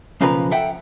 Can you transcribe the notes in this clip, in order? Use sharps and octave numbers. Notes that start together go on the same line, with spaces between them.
B1 C#3 F3 A#3 B4 A#5
A4 E5 F#5 G5